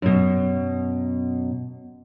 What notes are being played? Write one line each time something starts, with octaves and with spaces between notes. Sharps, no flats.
F#2 B2